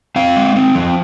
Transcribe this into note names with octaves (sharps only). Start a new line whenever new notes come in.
C4 F5
G#3
C4
F3